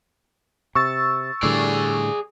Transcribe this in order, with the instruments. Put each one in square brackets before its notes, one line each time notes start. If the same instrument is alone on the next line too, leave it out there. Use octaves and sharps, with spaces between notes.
[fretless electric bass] C3 [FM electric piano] C#6 E6 A6
[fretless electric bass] A2 D3 G3 [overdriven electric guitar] G#4 D5